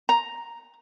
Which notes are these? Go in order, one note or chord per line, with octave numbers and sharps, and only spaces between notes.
A#5